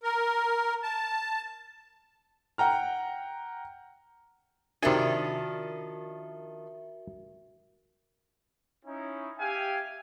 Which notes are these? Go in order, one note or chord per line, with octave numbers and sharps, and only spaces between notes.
A#4
A5
F#5 G5 A#5 F6
C3 D#3 F3 D4 F#4 A#4 E5 G#5
C#4 D#4 E4
G4 E5 F5 G5 G#5